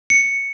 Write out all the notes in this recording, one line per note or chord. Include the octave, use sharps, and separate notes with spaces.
C#7